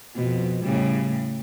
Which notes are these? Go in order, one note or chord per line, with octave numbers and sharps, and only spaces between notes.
F2 B2
A2 C#3 G3